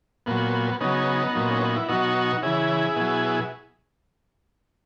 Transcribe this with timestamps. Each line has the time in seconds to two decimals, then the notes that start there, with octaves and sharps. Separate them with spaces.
0.26 A#2 F#3 B3
0.80 C#3 F#3 B3 D#4
1.35 A#2 F#3
1.50 C#4
1.62 D#4
1.76 E4
1.88 B2 F#3 D#4 F#4
2.42 C#3 E3 E4 G#4
2.96 B2 F#3